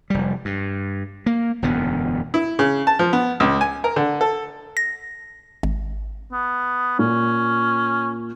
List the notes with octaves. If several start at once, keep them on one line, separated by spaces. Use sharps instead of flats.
F1 G3
G2
A#3
E1 F#2 D3 B3
E4
C#3
A5
F3
B3
C#2
G#5
A#4
D3
A4
A#6
G#1
B3
A#2 C#4